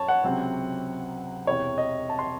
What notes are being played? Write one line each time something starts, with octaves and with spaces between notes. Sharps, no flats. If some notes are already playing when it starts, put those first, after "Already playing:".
Already playing: F#2 C#5 A5
F#5
C#2 C3 F#3 C4
E1 E2 C3 E3 C#5
D#5
A5
C6